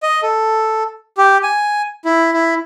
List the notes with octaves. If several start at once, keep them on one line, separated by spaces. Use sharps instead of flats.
D#5
A4
G4
G#5
E4
E4